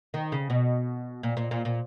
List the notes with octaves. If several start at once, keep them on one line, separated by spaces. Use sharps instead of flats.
D#3
C#3
B2
A#2
A#2
A#2
A#2